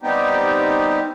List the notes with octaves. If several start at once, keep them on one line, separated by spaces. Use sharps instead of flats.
G3 B3 C4 D#4 G4